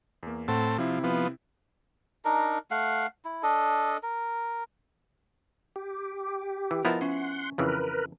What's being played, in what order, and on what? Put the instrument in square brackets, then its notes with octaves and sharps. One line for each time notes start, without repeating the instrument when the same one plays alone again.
[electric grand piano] E2 A#3
[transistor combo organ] A2 C4 A5 [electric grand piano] F#5
[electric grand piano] C3 C4 E4 [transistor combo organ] F3
[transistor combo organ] F3 B3
[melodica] D4 D#4 A#4
A3 F5 F#5
E4
D4 A4 D#5
A#4
[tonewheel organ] G4
[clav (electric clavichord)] E3
[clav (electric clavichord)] F3 B3 E4 [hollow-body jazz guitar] A#4 D#5 A5
[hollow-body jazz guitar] C#4 E5 [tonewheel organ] F#5 C6
[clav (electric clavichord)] F2 C#3 E3 [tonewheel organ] A#4 B4